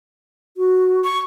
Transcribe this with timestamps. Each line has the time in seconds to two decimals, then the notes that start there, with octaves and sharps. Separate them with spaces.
0.57 F#4
1.04 C#6